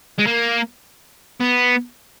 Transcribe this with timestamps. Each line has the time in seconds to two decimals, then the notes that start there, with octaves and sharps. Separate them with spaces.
0.19 G#3
0.27 A#3
1.41 B3